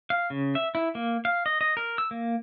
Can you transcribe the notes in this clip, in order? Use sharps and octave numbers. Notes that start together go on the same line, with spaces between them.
F5
C#3
E5
E4
A#3
F5
D#5
D#5
A#4
E6
A#3